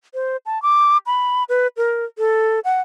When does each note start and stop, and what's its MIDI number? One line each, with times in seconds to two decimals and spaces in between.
0.14 0.37 72
0.46 0.61 81
0.62 0.98 86
1.06 1.44 83
1.49 1.67 71
1.77 2.05 70
2.18 2.60 69
2.64 2.81 78